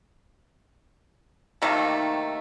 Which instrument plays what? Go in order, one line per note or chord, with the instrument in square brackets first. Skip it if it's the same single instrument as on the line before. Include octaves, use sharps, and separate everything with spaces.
[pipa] C3 D#3 A3 A#3